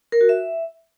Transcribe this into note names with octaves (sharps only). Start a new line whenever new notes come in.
A#4
F#4
E5